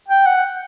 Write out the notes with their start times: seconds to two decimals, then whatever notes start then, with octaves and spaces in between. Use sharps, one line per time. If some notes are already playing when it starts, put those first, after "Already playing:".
0.09 G5
0.26 F#5